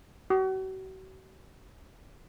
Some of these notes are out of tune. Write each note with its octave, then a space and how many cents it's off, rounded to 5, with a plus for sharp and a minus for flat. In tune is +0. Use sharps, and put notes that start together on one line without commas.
F#4 +40